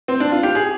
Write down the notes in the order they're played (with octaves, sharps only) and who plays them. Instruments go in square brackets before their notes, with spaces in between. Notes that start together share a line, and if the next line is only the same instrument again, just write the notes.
[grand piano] C4
D4
F4
G4
G#4